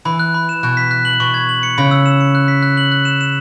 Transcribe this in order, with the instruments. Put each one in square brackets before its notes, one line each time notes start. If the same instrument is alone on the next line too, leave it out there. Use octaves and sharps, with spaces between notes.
[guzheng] E3 [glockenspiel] B5
[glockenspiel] F#6
B5
E7
[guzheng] B2 [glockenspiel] F#6
[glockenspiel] B6
F#6
F#7
[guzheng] B2 [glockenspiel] C#6
[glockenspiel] G#6
F#7
C#7
[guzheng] C#3 [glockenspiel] B5
[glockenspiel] E6
E7
C#7
F#6
B6
F#6
F#7
F#6
E7
E7